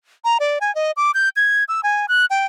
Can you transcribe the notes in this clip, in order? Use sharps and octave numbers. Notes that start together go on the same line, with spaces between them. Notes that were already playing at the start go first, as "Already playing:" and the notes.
A#5
D5
G#5
D#5
D6
G6
G#6
E6
G#5
F#6
G5